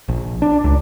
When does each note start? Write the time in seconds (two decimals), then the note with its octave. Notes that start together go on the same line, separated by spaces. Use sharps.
0.08 A#1
0.42 D4
0.64 C#2